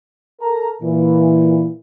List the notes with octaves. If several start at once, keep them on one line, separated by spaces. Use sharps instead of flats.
A4 A#4 A#5
A#2 E3